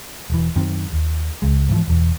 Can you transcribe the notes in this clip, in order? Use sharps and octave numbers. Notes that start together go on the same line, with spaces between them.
E1 E3
F#2 D#3 C4
D#2
C#2 G#3
G#2 E3 F3
E1 E2